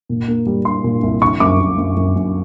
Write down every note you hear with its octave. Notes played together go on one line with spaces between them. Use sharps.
A#2
A#3
G3
G3 C6
A#2
C2
D3 C#6
F#2 D6
F#2
F#2
F#2
F#2